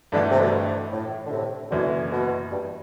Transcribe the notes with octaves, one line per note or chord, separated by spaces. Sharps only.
G2 B2 D3 E3 A3 D4
C3
B2 D3
A2
D3
A2 C3
F#1 F#2 B2 D3 E3
B2
G2